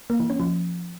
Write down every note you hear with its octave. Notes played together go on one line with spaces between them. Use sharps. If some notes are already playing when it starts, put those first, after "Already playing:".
A#3
E3
C#4
F3